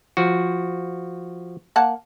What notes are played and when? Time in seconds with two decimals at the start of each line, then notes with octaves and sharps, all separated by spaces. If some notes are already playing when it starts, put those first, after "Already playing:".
0.17 F3 F#4
1.76 A#3 F#5 A5